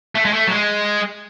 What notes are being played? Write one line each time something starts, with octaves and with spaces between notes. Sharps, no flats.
A3
G#3
A3
F#3
G#3